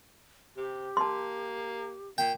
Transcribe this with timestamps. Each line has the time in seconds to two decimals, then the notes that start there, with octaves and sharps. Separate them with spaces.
0.56 C3 G4
0.97 A#3 A5 C6
2.18 A#2 G5